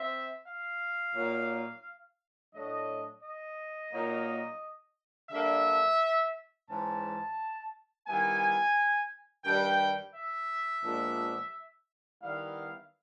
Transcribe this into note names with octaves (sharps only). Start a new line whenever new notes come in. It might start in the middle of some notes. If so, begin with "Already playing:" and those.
Already playing: C4 E5
F5
A#2 F#3 A#3 D#4
A2 F#3 A3 D4 D#5
D#5
A#2 F#3 A#3 D#4
D3 G3 A#3 D4 E5
G#2 E3 G#3 C#4 A5
D#3 G3 B3 E4 G#5
G2 D#3 G3 G5
E5
A#2 F3 G#3 B3 D4
D#3 G3 B3 E4 F5